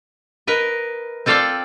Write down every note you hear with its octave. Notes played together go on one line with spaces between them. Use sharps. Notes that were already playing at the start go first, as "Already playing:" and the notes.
A#4 B4 D#5
C4 F4 A4 D5 F5 G5